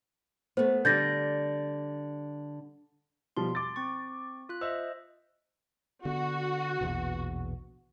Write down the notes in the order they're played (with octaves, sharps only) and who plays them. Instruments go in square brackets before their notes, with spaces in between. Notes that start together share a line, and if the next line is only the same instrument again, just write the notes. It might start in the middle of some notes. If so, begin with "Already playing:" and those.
[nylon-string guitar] A3 B3 [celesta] C5
[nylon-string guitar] D3 G3 [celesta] G6 A6 A#6
[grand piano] B2 F3 G3 [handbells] C6
[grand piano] D6 A6
[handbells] C4 C#6
F4 F#6
[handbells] C5 D#5 E5 [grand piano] E6
[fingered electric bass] D3 B3 [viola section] F#4
[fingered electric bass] A#1 E2 B2